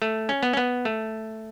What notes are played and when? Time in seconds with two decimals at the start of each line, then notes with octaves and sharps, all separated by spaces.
0.02 A3
0.29 C#4
0.43 B3
0.53 C#4
0.57 B3
0.85 A3